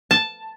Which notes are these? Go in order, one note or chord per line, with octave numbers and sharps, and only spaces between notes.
A5